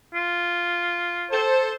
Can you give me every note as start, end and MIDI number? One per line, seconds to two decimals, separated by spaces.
0.14 1.33 65
1.30 1.70 69
1.30 1.70 72